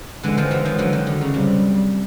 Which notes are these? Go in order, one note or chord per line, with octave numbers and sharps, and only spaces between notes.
D3 E3 G#3
D#3 F3
E3 F#3
D#3 F3
D3 E3 F#3
D#3
D3
C#3
C3 G3